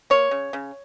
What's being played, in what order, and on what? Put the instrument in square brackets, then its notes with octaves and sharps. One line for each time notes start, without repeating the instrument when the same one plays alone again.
[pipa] A#3 C#5
C#3
C#3